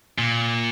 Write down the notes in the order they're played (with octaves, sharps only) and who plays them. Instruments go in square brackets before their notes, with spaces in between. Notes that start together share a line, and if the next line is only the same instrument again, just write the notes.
[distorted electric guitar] A#2